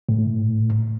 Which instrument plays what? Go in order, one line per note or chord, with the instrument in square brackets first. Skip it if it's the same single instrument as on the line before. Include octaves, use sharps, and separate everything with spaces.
[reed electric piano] A2